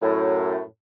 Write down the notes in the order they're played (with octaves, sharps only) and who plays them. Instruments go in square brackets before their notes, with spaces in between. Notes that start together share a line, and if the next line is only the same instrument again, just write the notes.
[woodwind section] F#2 A2